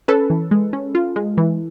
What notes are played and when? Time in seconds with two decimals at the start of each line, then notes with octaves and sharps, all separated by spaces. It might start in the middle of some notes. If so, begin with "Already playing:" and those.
0.08 C#4 A4 B4
0.30 E3
0.51 G#3
0.73 C#4
0.95 F4
1.16 G#3
1.37 E3